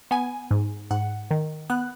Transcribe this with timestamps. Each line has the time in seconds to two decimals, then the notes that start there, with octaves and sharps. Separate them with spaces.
0.11 B3 G#5
0.51 G#2
0.91 G#2 F#5
1.31 D#3
1.70 B3 F#6